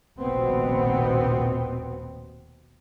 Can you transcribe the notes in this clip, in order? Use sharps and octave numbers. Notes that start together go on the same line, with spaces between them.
F1 A#1 D#2 B2 B3 C4